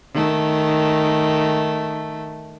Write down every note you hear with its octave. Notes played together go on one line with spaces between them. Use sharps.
D#3 A3